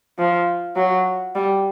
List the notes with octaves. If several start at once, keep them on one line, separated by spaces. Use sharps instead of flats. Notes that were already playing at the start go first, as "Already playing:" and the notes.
F3
F#3
G3